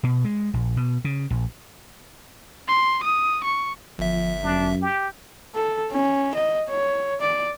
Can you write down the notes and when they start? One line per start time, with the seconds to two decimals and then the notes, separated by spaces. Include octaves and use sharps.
0.03 B2
0.24 G#3
0.54 A#1
0.77 B2
1.05 C#3
1.30 A#1
2.68 C6
3.04 D#6
3.44 C#6
3.99 G1 F3 E5
4.43 F#2 D4
4.82 G4
5.55 A4
5.92 C#4
6.35 D#5
6.70 C#5
7.21 D5